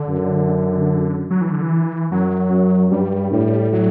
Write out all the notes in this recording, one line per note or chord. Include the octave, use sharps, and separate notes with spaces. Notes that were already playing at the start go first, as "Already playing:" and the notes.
Already playing: D3
F#2
F#3
E3
D3
E3
F#2 F#3
F#2
G2 G3
A2 G3
F#3